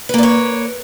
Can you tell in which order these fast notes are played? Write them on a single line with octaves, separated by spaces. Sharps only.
B4 A#3 D5 C#5